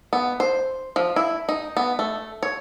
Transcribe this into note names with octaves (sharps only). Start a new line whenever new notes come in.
B3
C5
F3
E4
D#4
B3
A3
C#5